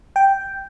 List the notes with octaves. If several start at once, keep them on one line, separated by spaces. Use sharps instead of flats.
G5